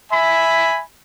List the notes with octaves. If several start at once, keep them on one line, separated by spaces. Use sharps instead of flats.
E5 G#5 B5